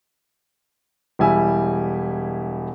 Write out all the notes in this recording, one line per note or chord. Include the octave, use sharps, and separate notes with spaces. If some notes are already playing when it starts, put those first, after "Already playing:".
E1 G3 E4 G#5 E6